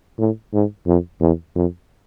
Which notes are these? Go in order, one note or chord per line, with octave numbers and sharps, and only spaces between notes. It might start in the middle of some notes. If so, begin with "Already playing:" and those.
A2
G#2
F2
E2
F2